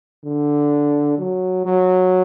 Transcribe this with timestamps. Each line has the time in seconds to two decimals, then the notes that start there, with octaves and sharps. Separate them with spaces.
0.24 D3
1.18 F#3
1.65 F#3